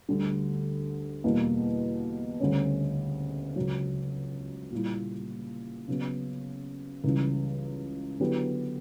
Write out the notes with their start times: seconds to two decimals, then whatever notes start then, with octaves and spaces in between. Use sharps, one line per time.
0.09 D2 D3 G3
1.24 E2 B2 G3 A#3
2.40 D2 C#3 G3 C#4
3.56 C#2 C#3 F#3
4.71 A#2 G3 A#3 E4
5.88 C#3 F#3 B3
7.04 C#2 C#3 E3 G3 C#4
8.20 D3 F#3 B3 E4 G4